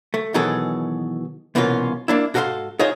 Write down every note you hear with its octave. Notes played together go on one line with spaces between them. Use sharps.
A3
B2 D#3 E3 F#3 G#4 A4
C2 B2 E3 A#3 C#4 F4
A#3 D4 E4
G#2 F#4 A4 A#4 F5 C6
D#4 F4 G#4 C5 C#5 D#5